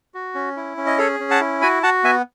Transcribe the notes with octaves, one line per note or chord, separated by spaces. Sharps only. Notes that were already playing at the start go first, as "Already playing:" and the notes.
F#4
C#4
E4
C#4
D#5
G#4 A4 C#5
C#4
F#5 A5
E4
F#4 G#5 B5
F#4 F#5 A5
B3 E5 G#5